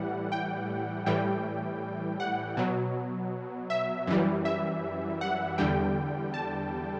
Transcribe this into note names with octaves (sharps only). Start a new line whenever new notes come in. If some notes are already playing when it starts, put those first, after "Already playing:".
Already playing: A2 E3 G3 F#5
G5
A2 E3 G3 G5
F#5
B2 F#3
E5
F#2 E3 G3
E5
F#5
E2 D3 G3 G5
A5